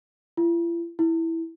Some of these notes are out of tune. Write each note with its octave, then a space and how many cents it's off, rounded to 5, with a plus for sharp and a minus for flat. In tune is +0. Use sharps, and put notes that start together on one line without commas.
E4 +45
E4 -5